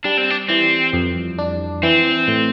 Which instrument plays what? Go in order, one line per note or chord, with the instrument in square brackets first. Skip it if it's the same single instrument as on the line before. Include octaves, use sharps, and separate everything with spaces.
[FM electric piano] G3 [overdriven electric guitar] D4
[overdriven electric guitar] C4
D4
[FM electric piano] E3 [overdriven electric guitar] C4
[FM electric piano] F2
D4
[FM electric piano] E3 [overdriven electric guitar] C4
[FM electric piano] A2